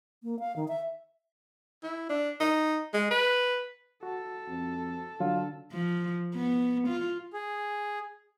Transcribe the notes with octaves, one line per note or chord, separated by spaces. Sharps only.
A#3
F5
D#3
E5
E4
D4
D#4
G#3
B4
F#4 A4
F2
D3 F#3 F4
F3
B3
F4
G#4